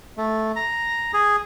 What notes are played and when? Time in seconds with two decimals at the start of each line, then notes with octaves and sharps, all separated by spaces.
0.18 A3
0.56 A#5
1.13 G#4